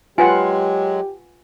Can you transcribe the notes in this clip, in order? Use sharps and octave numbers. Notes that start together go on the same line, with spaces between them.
F#3 G#3 F4 G4 B4 F#5 G#5